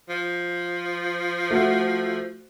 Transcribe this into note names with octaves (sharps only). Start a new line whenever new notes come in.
F3
A3 F#4